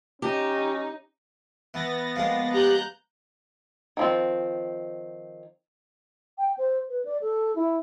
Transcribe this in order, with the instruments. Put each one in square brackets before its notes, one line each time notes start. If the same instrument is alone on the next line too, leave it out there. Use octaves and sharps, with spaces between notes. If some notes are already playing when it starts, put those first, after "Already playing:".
[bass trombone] C#4 [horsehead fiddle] D#4 [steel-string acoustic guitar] G4
[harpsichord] E3 [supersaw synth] B3 A6 A#6
[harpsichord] F3 G#3 A#3
[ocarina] G4 [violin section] A#5 F#6 G6
[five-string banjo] D#3 F3 C4
[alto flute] G5
C5
B4
D5
A4
E4